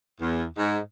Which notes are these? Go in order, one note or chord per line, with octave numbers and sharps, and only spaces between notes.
E2
G#2